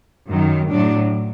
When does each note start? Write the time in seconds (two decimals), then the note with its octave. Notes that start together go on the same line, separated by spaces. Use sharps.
0.29 F#2 D#3 F#3
0.69 A2 F#3 D4